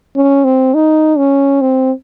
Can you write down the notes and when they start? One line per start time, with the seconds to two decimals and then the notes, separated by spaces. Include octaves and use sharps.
0.16 C#4
0.45 C4
0.74 D#4
1.18 C#4
1.61 C4